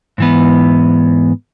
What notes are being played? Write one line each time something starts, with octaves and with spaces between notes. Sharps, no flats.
G#2 E3 B3